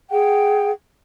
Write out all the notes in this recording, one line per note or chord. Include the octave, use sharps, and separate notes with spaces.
G#4 F#5 G5